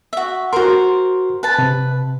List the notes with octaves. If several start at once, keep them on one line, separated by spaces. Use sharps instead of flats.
F#4 E5
F#4 A#4 C5 C6
B4 A5
C3